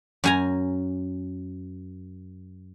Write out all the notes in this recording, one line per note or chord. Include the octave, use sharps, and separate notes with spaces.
F#2 G#5 A#5